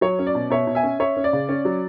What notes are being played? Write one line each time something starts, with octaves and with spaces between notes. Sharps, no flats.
F#3 C#5
C#4
D5
B2
B2 C#5 E5
B2
E5 G#5
C#4
C#4 C#5 E5
C#4
D5
C#3
C#4
F#3